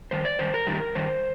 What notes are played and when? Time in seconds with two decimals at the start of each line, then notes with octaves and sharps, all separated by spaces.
0.11 G2 D#3 C5
0.25 D5
0.39 G2 D#3 C5
0.54 A#4
0.67 G2 D#3 G3
0.95 G2 D#3 C5